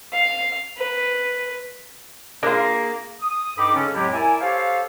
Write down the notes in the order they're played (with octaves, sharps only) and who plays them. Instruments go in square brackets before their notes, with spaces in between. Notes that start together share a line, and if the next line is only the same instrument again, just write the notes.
[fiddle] F5
B4
[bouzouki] A#3 [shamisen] D4 F4 [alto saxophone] G#4
[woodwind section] D#6
G2 D#4 A4 G5 B5 D6
C#3 G#3 C#4 A4
F2 A2 F#3 G#3 E4 G4
E4 A#4 D5 E5 G#5
G4 A4 C5 C#5 F5